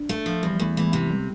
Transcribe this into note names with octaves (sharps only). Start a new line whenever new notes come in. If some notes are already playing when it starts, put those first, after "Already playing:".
Already playing: D4
A3
F3
E2 G3
E2 A3
E3 G#3
C3
G3